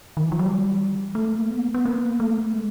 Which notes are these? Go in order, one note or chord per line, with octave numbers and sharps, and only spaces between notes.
D#3
E3
F3
F#3
G3
A3
A#3
B3
B3
A#3
A3
G#3